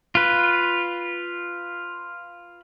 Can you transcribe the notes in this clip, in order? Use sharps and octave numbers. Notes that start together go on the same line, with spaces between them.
F4 B4